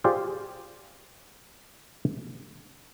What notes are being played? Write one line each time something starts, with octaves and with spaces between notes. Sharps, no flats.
F4 G4 G#4 C5 D5 F5